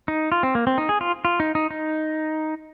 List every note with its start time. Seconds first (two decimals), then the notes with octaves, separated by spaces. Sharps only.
0.08 D#4
0.32 F4
0.43 C4
0.55 A#3
0.67 C4
0.78 D#4
0.89 G#4
1.01 F4
1.25 F4
1.40 D#4
1.55 D#4
1.71 D#4